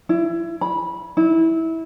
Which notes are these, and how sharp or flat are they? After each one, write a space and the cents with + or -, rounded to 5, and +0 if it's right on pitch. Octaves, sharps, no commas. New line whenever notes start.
E4 +25
B5 -20
E4 -20